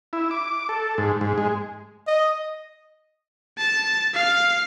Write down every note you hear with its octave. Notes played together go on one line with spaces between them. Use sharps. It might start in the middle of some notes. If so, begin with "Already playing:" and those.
E4
D6
A4
G#2
G#2
G#3
D#5
A5
F5